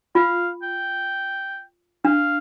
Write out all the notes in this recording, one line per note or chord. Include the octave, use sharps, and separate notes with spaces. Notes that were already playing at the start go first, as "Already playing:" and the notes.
F4 F5
G5
D4 F5